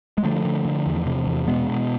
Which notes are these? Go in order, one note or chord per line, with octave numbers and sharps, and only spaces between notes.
G#3
D3 F3 A3
D3
D3
E2
C3
E2
B2 G#3 B3
B2